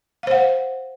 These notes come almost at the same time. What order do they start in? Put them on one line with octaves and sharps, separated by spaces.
F5 C5 F#5